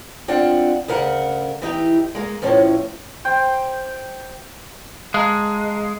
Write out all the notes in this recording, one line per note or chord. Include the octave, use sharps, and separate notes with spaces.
C4 D4 F4 F#5
D2 C#3 A#4 F#5
E3 D#4 G4
G#3 A#3
E2 A2 F3 C#4
C5 G5
G#3 F5 A5 A#5